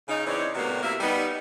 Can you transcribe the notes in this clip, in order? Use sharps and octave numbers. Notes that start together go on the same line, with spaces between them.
C#3 D#4
C#3 E3 C4 C#4 C#5 D5
A2 C3 G3 A#3 B3 F#4
C3 A#3 E4 E5
G3 B3 D#4